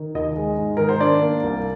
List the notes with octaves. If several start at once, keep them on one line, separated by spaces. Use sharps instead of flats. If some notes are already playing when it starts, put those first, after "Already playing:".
Already playing: D#3
D#2 D#5
G#3
G#2
D#3 A#4
C5
D4 D5
A#3
C2